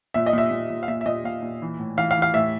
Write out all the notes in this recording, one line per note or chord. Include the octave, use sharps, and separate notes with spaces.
A#2 E5
D#5
A#2 E5
A#2
A#2
F5
A#2 E5
E5
A#2 D#5
A#2 F5
A#2
E3
A2
E3 F5
F5
E3
F5
A2 E5